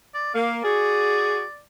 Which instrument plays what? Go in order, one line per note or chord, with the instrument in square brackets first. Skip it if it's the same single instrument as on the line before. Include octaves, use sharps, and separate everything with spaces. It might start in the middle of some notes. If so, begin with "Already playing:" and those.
[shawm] D5
[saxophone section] A#3 [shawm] F5
[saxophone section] F#4 G#4 [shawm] D5